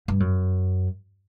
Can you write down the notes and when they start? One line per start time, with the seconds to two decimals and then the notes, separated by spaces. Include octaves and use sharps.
0.08 G2
0.20 F#2